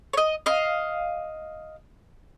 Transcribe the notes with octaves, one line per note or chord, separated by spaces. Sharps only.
C#5 D#5
D#5 F5